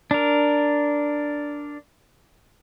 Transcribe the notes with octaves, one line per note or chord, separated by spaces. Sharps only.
D4 A#4